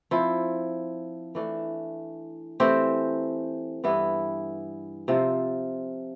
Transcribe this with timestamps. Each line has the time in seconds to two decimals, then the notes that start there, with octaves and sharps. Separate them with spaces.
0.11 F3 C4 E4
1.35 E3 A3 D4
2.60 E3 A3 C4 G4
3.84 G2 E3 B3 E4
5.08 C3 F3 C4 F4